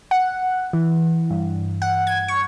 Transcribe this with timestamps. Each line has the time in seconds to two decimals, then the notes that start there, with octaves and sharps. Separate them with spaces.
0.11 F#5
0.73 E3
1.30 G2
1.82 F#5
2.07 G#6
2.28 C#6